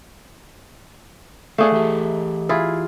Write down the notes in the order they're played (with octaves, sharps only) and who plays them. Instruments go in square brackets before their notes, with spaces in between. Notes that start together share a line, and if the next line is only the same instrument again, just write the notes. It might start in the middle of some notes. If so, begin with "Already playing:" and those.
[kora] A3 G#4 F#5 [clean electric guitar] D5 F5
[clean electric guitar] E3 G4 E5
[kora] E4 F4 G#4